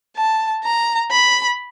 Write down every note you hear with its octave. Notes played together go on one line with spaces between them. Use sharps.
A5
A#5
B5